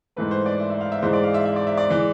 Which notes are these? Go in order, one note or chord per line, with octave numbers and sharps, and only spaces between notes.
G#2 E3 A3 B4
C5
D5
E5
E5
F5
E5
G#2 E3 G#3 C5
D5
F5
E5
E5
D5
E5
D5
E3 G#3